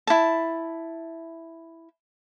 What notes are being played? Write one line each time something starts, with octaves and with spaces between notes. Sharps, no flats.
E4 A5